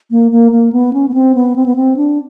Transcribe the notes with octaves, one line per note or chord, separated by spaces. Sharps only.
A#3
A#3
A#3
B3
C#4
B3
C4
B3
C4
B3
C4
D4